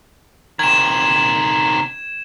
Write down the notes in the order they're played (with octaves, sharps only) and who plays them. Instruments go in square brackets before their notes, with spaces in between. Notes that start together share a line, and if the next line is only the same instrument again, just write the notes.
[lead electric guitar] C3 D#3 [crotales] G#6 E7